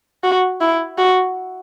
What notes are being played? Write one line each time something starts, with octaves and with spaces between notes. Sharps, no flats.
F#4
E4
F#4